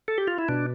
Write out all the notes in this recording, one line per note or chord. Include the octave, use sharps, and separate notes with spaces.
A4
G4
F4
E4
B2 D4